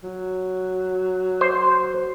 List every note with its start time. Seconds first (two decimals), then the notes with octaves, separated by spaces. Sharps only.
0.04 F#3
1.41 C5